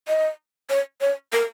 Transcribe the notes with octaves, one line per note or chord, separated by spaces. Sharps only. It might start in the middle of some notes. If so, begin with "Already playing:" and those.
D#5
C#5
C#5
A#4